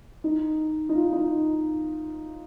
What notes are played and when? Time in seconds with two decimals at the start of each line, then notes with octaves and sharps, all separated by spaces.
0.24 D#4
0.89 D#4
0.95 F4
1.13 D#4